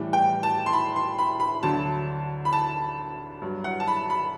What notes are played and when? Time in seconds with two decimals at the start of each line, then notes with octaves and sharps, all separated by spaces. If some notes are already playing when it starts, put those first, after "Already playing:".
Already playing: A2 E3 G3
0.13 G5
0.43 A5
0.66 C6
0.73 B5
0.96 C6
1.18 B5
1.40 B5
1.63 D2 D3 F#3 A5
2.45 B5
2.53 A5
3.42 G2 F#3
3.64 F#5
3.80 A5
3.88 B5
4.10 B5